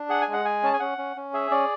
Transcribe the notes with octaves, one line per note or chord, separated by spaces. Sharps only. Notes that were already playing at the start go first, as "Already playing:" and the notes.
Already playing: D4
G#4 F#5
G#5
G#3
F#5
G#4 G#5
C#4 A5
G#5
C#4 F#5
C#4
C#4
G#4 E5
C#4 D5